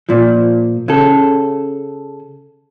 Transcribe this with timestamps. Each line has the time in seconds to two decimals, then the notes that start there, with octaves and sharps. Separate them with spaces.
0.09 A#2 F3
0.88 C#3 A4